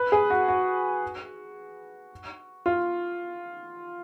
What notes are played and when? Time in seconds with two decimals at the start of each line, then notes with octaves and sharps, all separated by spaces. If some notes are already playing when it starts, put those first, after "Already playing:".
Already playing: B4
0.12 G#4
0.30 F#4
0.48 F#4
2.66 F4